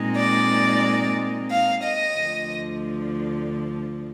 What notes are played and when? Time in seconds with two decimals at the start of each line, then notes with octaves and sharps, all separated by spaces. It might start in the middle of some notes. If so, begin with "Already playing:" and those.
Already playing: A#2 G#3 C4 D#4
0.15 D5
1.51 F5
1.83 D#5
2.17 D2 D3 F3